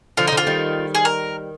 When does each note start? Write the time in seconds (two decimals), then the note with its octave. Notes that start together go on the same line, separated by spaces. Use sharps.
0.17 D3 F3 F4
0.27 D#4
0.32 D3 F3
0.37 F4
0.47 D#3 G3
0.95 G#4
1.05 A#4